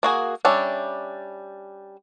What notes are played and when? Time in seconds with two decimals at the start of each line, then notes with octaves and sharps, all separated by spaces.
0.03 A#3 F#4 G#4
0.45 G3 C#4 D4 E5